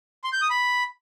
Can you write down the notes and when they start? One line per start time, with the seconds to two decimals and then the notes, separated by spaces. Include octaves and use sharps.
0.24 C6
0.33 G6
0.42 D#6
0.50 B5